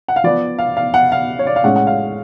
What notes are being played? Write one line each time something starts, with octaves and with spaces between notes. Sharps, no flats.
F#5
F5
F3 B3 D5
F5
F5
F#5
F5
C#5
D5
F5
A2 G#3 C#4 F#5
F#5
F5